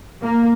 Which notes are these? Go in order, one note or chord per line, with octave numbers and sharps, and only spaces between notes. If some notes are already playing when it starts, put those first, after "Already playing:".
A#3